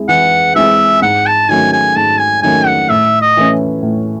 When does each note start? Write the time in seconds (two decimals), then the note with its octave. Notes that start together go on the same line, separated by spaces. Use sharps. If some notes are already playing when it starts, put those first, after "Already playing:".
Already playing: G#3 C4 E4 G#4
0.09 E3 F#5
0.56 G#3 C4 E4 G#4 E5
1.02 G#2 F#5
1.26 A5
1.49 D#3 F#3 A3 C#4 G#5
1.73 G#5
1.96 G#2 A5
2.19 G#5
2.43 D#3 F#3 A3 C#4 G#5
2.66 F#5
2.90 A2 E5
3.21 D#5
3.37 E3 A3 C#4
3.83 A2